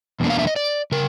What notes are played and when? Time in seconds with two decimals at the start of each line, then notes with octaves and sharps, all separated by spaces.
0.20 E2 B2 A#3 D4
0.30 F5
0.39 E5
0.47 D#5
0.56 D5
0.92 C#3 A#4